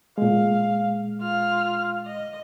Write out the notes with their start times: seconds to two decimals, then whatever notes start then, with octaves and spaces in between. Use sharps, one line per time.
0.18 A#2 G#3 F5
1.21 F4 F6
2.07 D#5